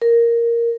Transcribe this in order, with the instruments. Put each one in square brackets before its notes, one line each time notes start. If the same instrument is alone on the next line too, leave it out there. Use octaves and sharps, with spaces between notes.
[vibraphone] A#4